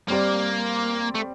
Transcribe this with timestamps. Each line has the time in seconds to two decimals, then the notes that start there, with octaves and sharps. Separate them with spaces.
0.09 G3 A#3 C4 G4 D5
1.15 A3